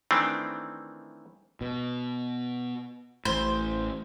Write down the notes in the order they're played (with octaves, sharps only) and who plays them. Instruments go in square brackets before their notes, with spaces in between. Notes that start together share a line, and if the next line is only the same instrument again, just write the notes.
[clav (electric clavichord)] D#3 E3 A3 C4 D4
[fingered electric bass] B2
[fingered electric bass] A1 A2 [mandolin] C5